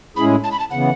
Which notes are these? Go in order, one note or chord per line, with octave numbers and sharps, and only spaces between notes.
A2 G#3 C#4 E4 G#4 B5
A5
B5
A5
C#3 E3 B3 F#5